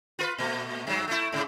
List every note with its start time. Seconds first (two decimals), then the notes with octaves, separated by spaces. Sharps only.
0.19 F4 A#4 B4
0.38 A#2 A3
0.87 G2 F#3
1.08 A3 E4
1.32 G#2 C#3